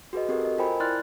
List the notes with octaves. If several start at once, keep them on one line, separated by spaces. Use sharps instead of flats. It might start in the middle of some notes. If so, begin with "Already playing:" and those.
F#4 G#4 B4 D#5
C4 F#4 G4 A4 A#4
D#5
F4 A#4 C5 G5 G#5 B5
E4 D5 C6 F6 F#6 A6